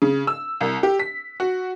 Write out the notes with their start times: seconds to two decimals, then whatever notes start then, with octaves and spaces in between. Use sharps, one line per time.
0.02 C#3
0.27 E6
0.61 C2
0.83 G4
0.99 B6
1.40 F#4